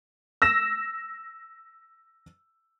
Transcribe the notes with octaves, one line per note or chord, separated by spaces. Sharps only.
E6 A#6 E7